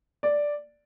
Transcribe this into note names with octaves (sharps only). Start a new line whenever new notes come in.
D5